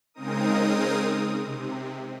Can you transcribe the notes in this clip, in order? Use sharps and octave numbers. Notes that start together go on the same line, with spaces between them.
C#3 G#3 C4 D#4 A#4 D#6
C3